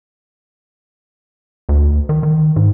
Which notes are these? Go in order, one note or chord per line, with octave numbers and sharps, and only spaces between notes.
D2
D#3
D#3
G#2